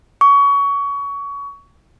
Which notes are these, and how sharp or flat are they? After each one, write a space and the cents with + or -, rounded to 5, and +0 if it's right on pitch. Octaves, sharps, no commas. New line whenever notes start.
C#6 +25